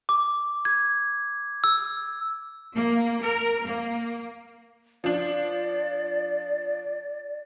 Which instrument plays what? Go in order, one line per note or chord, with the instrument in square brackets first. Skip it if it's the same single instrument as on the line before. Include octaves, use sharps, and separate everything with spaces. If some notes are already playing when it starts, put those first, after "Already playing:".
[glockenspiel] D6
G#6
E6
[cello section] A#3
A#4
A#3
[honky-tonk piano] F3 D4 [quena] D5